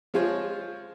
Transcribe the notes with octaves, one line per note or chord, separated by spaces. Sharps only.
F3 G#3 F4 G#4 C5 C#5